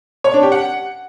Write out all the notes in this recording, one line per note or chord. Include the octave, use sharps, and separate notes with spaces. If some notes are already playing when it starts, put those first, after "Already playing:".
C#5
D4
G4
F#5